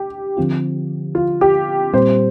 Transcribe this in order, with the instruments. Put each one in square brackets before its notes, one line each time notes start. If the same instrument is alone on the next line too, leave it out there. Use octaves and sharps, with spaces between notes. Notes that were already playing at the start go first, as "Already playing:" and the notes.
Already playing: [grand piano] G4
[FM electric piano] D3 F3 C4 F4
[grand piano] F4
G4
[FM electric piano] A#2 G3 C4 G4 [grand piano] C5